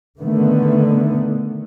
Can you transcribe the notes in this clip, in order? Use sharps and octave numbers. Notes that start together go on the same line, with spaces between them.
D3 D#3 A3 B3